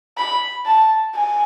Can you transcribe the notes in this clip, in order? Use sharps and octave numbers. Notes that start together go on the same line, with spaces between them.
B5
A5
G#5